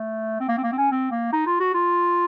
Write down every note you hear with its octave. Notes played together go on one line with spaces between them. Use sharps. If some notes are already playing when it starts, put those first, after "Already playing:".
Already playing: A3
C4
A#3
C4
A#3
C4
C#4
C4
A#3
D#4
F4
F#4
F4